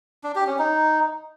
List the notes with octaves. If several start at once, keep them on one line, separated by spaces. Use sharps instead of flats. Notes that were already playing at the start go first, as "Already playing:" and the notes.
D4
G4
C#4
D#4